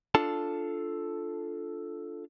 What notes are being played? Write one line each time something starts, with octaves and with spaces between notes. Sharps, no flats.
D4 F4 A4 A5